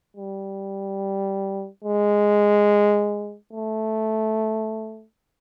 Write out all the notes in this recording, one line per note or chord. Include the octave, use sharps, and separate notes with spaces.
G3
G#3
A3